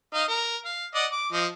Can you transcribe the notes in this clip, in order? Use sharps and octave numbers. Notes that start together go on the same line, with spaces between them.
D#4 D#5 F5
A#4
F5
D5 D#5 F#5
D6
F3 D#5